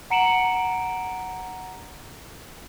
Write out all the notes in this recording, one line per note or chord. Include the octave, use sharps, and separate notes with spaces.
F#5 A#5 C#7 D7 E7 F#7